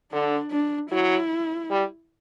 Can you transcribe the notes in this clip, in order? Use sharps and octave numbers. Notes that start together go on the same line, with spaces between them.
D3 D4
D4
F#3 E4
G3